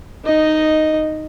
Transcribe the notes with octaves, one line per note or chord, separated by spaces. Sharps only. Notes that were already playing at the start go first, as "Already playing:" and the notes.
D#4 D#5